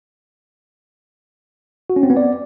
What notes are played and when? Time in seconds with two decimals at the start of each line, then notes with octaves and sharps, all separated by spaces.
1.90 F#4
1.96 C#4
2.03 C4
2.10 B3
2.17 D5